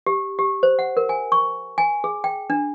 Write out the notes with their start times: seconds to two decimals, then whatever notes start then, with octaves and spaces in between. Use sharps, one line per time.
0.06 G4
0.39 G4
0.63 C5
0.79 F#5
0.97 A#4
1.09 G#5
1.32 C#6
1.78 G#5
2.04 G#4
2.24 G5
2.50 D4